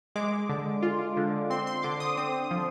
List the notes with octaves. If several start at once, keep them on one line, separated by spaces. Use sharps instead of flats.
G#3 D6
D3
F4
D3
C4 C6
C6
D3 D6
D#6
C4 D#6
F3